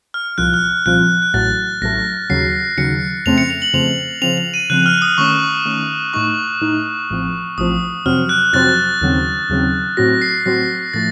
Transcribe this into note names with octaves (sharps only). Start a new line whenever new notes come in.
F6
C2 A#2 F3 C4 F4 F#6
F6
C2 A#2 F3 C4 F4 F#6
F#6
A1 A2 F#3 A3 A6
A1 A2 F#3 A3 A#6
D#2 C#3 F#3 C7
D#2 C#3 F#3 C#7
F2 C#3 A3 C4 F7
C#7
F7
F#7
F2 C#3 A3 C4 F7
C#3 F3 C4 F7
F7
D#7
C#3 F3 C4 F#6
F6
D#6
D#3 A3 C#4 C#6
D#3 A3 C#4
A2 A3 D#4 C#6
A2 A3 D#4
A1 A2 F3 C4
A1 A2 F3 C4 D#6
F2 C3 F#3 C4 F6
F#6
F2 C3 F#3 C4 A6
D#2 C#3 F#3 C4
D#2 C#3 F#3 C4
A2 F#3 C4 F#4 A#6
C7
A2 F#3 C4 F#4 A#6
A2 F3 A3 A6